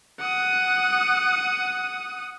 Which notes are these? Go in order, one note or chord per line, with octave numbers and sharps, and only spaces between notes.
F#5 D#6